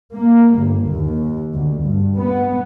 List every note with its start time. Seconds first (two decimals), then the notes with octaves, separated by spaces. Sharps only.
0.14 A#3
0.56 G1
0.90 D#2
1.53 D2
1.82 G2
2.17 B3